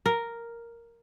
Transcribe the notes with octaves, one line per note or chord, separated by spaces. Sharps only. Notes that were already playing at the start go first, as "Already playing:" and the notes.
A#4